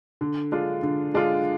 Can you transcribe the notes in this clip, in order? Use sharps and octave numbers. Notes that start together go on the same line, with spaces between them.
D3
G#3 D4 F4
D3
G#3 D4 F4